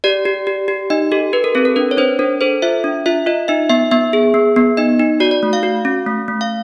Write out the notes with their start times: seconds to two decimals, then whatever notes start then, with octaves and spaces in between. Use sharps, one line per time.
0.04 G4 D5
0.25 G4
0.47 G4
0.68 G4
0.90 D#4 D#5
1.12 G4 A4
1.33 G4 B4
1.44 A#4
1.55 C4 A4
1.65 A#4
1.76 D4 B4
1.91 C#5
1.97 D4 C5
2.19 D4 A#4
2.41 A4 C5
2.62 F4 E5
2.84 D4
3.06 F4 E5
3.26 F4 D#5
3.48 D#4 E5
3.69 B3 E5
3.91 B3 E5
4.13 G#4
4.34 B3
4.56 B3
4.77 D#4 D#5
4.99 D#4
5.20 F#4 D5
5.31 D5
5.43 A3
5.53 F5
5.63 F#4
5.85 C#4
6.06 A3
6.28 A3
6.41 F5